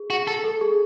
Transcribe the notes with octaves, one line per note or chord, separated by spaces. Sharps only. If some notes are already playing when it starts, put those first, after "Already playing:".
Already playing: G#4
F#4
A4
A4
G#4